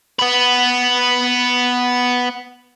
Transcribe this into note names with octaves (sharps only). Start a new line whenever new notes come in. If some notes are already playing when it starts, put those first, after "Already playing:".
B3 B4